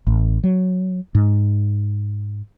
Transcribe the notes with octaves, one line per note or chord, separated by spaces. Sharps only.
A1
F#3
G#2